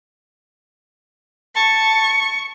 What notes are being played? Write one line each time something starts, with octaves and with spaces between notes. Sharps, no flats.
A5 C#6